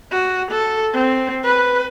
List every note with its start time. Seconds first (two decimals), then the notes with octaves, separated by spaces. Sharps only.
0.12 F#4
0.51 A4
0.94 C4
1.45 B4